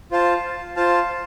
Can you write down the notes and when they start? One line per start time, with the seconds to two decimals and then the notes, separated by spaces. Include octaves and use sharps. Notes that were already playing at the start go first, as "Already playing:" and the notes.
0.11 F4 C5 F5 A5
0.76 F4 C5 F5 A5